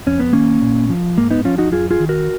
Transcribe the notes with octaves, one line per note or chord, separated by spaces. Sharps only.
F2 C#4
B3
D#3 A#3 C#4
A#2
F3
G#2 A#3
B3 D#4
F3 C#4 F4
D#4 F#4
F#2 F4 G#4
F4 G#4
D#3
F#4 A#4